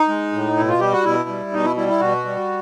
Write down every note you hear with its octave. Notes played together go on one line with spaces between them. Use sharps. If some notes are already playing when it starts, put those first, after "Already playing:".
Already playing: D#4
G#3
A2
B2 E4
F4
G3 G4
F#4
B2 E4
G3
B2 D#4
E4
G3 E4
E4
B2 F#4
G3